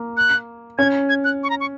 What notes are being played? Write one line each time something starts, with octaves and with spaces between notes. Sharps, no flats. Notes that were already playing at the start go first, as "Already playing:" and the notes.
Already playing: A#3
F#6
C#4 G#6
G#6
F#6
C#6
A#5
C#6